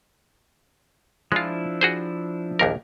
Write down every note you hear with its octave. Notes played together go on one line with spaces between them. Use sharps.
F3 G#3 D4 E4 F4
F#4 G#4 C5
A#1 D#2 A#4